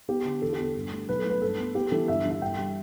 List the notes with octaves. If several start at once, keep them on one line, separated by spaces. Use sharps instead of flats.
B3 G4
D3
E2 A4
G4
B3 A4
G2
A3
B1 B4
A4
A3 B4
G2 A4
B3
B3 G4
E3 A4
G1 E5
E3 E5
G1 G5
G3